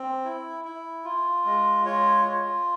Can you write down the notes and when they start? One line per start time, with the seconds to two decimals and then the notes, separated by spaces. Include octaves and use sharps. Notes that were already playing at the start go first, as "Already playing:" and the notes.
Already playing: C4
0.25 E4
0.65 E4
1.04 F4
1.45 G#3
1.86 F4 C#5
2.25 F4